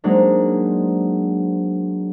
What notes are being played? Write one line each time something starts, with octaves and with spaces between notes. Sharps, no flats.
F#3 G#3 A#3 C4 D4 D#4